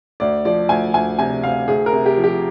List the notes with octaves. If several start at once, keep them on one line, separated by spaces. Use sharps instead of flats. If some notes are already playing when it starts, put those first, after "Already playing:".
D2 D5
F3 D5
D2 G#5
D2 G#5
C3 G#5
D2 F5
D2 G#4
A#4
C3
G4
F3
G4